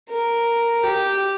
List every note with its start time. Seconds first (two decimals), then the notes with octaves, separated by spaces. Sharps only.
0.09 A#4
0.83 G4